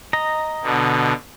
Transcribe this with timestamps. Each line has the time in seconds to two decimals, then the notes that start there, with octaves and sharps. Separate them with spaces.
0.13 D#5 A#5
0.63 B2 D3